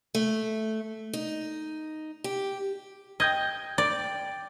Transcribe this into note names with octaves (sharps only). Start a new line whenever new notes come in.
A3
D#4
G4
D#5 G5 G6 G#6
D5